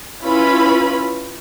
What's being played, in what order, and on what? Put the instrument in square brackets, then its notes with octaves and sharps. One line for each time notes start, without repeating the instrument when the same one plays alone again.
[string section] C#4 E4 F4 B4 B5